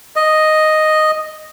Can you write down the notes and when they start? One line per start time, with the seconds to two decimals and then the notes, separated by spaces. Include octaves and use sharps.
0.16 D#5